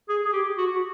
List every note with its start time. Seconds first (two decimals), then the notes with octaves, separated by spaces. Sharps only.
0.09 G#4
0.25 G#4
0.33 G4
0.58 F#4
0.71 F#4